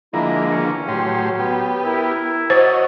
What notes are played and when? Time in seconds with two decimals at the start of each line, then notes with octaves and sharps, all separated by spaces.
0.14 D3 F3 G#3 A#3 E4 A#5
0.51 E2 D#3 C#4
0.88 A2 F#3 G4 C6
1.39 B3 G4
1.85 E4 A#4
2.50 F#4 C5 C#5 D#5